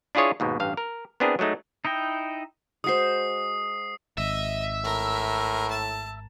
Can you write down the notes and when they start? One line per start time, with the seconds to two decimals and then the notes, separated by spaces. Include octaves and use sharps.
0.15 D4 E4 F4 G#4 C#5 D#5
0.40 D#2 G#2 B2
0.60 A1 G2 F5
0.77 A#4
1.20 B3 C4 D4 E4 G#4 A#4
1.39 F#3 G#3 A3 D#4
1.85 D#4 E4 D#5 G5
2.84 G#3 F#4 C5 D#6 C7
4.18 G#1 D#5 E5
4.84 A2 A#4
5.70 A5